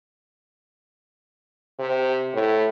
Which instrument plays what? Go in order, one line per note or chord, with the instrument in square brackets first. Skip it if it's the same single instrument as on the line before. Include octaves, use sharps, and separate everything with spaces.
[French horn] C3
A2